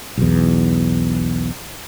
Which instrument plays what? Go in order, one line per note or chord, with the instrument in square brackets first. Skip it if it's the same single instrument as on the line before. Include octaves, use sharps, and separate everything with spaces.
[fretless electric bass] B1 E2